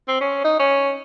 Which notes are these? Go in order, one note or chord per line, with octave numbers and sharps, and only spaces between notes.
C4
C#4
D#4
C#4